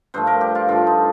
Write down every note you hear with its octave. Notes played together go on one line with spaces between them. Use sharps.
G2 F3 A3 C5
A#4
G4
F4
G2 D3 F3 A3 F4
D#4